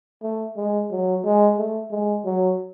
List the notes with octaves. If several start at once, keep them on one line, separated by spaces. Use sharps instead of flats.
A3
G#3
F#3
G#3
A3
G#3
F#3